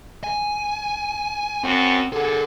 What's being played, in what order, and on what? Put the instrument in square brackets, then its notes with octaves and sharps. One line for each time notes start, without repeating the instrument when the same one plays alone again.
[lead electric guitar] G#5
[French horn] F#2 [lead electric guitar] C4 G5
[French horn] D3 [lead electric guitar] G#4 A4